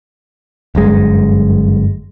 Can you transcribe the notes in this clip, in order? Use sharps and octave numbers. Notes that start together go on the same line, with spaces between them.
G1 F#2 G#3